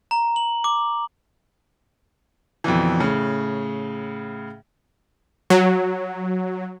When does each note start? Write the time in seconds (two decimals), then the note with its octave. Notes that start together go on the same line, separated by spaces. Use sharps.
0.11 A#5
0.36 F#7
0.64 D6
2.64 F2 B2 D3 E3
3.00 A2 C#3
5.50 F#3